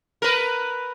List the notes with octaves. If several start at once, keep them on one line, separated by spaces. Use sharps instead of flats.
A#4 B4